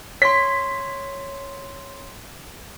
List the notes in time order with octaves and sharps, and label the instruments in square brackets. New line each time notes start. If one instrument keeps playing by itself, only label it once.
[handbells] C#5 C6 [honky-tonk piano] B6